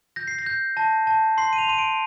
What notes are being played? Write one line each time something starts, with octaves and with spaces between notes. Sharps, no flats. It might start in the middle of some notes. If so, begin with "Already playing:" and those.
G6 A#6
C7
A#6
G6
A5 A#6
A5
C6 C7
D#7
F7
C6 D#7
D7